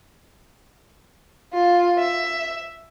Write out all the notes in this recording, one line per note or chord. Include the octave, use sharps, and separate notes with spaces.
F4
E5